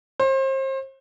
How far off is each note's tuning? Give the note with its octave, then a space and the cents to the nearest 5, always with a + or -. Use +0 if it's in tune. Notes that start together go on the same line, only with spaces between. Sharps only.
C5 +35